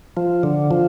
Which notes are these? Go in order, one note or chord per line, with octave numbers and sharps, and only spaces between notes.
F3
D3
F3